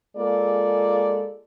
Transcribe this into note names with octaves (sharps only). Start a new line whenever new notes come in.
G#3 A#3 F4 G#4 A4 D5